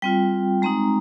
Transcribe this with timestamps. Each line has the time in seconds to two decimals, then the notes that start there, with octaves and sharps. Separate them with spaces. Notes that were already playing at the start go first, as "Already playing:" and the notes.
0.02 G3 C4 F4 G5
0.62 G#3 C4 D#4 A#5